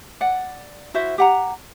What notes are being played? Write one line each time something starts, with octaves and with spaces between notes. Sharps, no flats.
D5 F#5
E4 F#4 C5 E5
G4 F#5 A#5